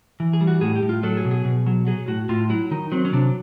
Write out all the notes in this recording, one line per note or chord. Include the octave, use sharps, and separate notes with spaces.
E3
G#4
G3
F#4
A2 G#4
G4
A2
F4
F#3 A4
G#4
B2
G#4
B2
F#3
F#3 G#4
A2 F#4
A2 F4
F#3 E4
D#3 D#4
F#3 C4
C#4
C3 D4